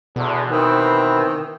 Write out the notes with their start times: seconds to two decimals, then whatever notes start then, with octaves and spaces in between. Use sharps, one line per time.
0.16 E2 B2 D3 E3
0.50 D#3 E3 C4